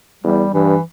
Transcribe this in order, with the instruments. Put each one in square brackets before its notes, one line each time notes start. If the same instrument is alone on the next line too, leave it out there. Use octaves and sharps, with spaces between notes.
[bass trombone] E2 [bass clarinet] G3
[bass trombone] G2 [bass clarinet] E3